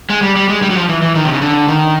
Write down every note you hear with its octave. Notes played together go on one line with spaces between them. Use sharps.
G#3
G3
G3
G#3
G3
F#3
F3
E3
E3
D#3
C3
C#3
D3
D#3